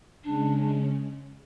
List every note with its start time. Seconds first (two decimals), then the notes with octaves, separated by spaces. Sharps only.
0.24 C#3 G#3 C#4 D4